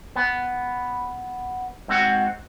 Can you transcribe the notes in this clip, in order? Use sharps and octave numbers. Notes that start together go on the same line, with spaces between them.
B3
G#2 C4 F#4 F#5